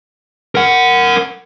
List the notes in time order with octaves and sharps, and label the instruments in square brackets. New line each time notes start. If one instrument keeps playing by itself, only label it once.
[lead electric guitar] A#4 F#5